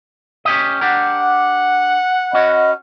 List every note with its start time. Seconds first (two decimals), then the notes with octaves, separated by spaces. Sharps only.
0.45 C#4 G4 D#5
0.81 D4 G4 A#4 F#5
2.33 C#4 F#4 D#5 B5